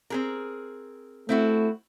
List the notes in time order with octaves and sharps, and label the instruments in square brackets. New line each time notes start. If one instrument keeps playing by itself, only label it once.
[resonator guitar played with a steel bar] C4 G#4 A#4
[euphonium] A3 [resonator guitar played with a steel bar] C4 E4 F#4